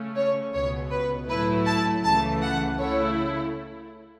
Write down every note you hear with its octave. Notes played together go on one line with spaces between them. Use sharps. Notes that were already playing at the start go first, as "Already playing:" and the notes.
Already playing: C#3 A3 C#4
C#5
C#2 B2 B3 C#5
B4
A2 F#3 A3 E4 B4
A5
C#2 C#3 E3 A3 A5
F#5
C#3 A3 E4 C#5